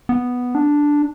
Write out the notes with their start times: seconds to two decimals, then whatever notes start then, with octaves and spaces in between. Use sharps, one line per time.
0.09 B3
0.55 D4